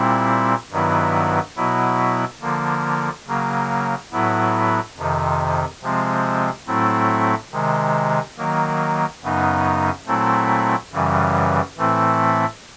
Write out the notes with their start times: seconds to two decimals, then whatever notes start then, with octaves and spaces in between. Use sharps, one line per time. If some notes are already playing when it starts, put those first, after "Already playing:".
Already playing: A#2 G3 C4 E4
0.71 G2 D#3 F#3 B3 E4
1.56 B2 F#3 B3 E4
2.41 D3 F3 A#3
3.27 C#3 F#3 A#3
4.12 A2 F#3 B3 E4
4.97 F2 C3 D#3
5.82 C3 F3 G#3 C4
6.67 A2 F#3 A3 C4 E4
7.52 C3 D#3 G#3
8.37 D#3 F#3 A#3
9.23 F#2 C#3 F#3 B3 D#4
10.07 A#2 F#3 A3 C4 E4
10.93 F#2 C#3 E3 G3
11.77 A2 E3 A3 C4 E4